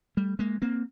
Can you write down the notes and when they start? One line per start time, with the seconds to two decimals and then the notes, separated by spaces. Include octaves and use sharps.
0.17 G3 A3
0.39 G#3 A#3
0.62 A#3 C4